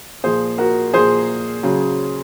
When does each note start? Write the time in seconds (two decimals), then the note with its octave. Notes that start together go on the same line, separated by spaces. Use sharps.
0.24 A#2 F3 G#4 C5
0.58 F#4 A#4
0.93 A#2 F3 G#4 C5
1.63 C#3 F#3